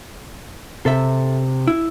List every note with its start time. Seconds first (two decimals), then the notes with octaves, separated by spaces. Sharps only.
0.86 C3 A4 E5
1.67 E4